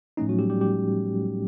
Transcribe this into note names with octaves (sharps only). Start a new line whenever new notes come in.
A2 F3 A3 C#4 D#4
F#3 F#4
G3 G4
G3 G4
G3 G4